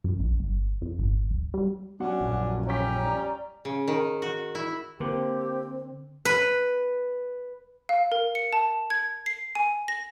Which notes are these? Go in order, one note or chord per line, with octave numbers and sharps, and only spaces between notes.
F#2
A#1
G1
F2
G#1
D1
G3
F#3 C#4 D4 F#5
A#1 F#2
G3 C#4 G4 C#5 A#5 B6
D5
C#3
D#3
F#4
E4
D3 A#3 C4 G4
B4
F5
A#4
C#7
A5
G#6
C7
G#5
A#6